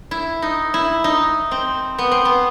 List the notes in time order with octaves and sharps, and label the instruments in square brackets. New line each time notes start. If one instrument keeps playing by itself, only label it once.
[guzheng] E4
D#4
E4
D#4
C4
B3
C4
B3